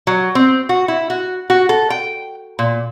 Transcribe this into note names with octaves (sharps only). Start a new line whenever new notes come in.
F#3
C4
F#4
E4
F#4
F#4
A4
G5
A#2